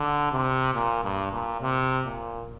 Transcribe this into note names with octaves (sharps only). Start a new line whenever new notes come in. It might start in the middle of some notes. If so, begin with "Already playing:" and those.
Already playing: D3
C3
A#2
G2
A#2
C3
A#2